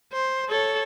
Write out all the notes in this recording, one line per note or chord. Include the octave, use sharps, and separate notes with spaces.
C5
A4 C#5